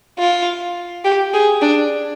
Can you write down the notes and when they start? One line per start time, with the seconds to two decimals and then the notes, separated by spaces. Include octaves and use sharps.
0.19 F4
1.04 G4
1.33 G#4
1.62 D4